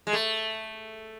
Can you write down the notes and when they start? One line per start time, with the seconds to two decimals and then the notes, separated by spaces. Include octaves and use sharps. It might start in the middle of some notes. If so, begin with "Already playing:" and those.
0.07 G#3
0.13 A3